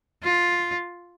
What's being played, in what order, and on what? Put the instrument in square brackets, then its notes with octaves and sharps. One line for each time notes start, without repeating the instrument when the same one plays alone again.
[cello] F4